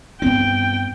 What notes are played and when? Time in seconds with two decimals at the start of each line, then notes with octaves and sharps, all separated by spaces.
0.22 G2 B3 C4 G5